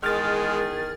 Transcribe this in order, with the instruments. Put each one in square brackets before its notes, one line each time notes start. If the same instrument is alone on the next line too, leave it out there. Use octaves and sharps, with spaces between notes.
[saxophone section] E2 D#3 G#4 [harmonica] G#3 [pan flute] A#4 [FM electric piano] F6 A6